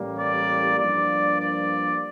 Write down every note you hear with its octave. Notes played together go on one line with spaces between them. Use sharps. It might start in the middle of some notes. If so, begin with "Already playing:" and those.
Already playing: A1 A2 G3 A#3
D5
G2 F3 A#3 D5
D5